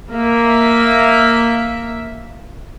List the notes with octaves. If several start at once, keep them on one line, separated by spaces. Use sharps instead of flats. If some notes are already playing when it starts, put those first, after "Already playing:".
A#3 E5